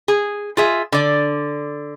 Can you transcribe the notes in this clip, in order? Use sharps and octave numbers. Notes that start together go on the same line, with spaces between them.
G#4
F4 G#4 E5
D3 D5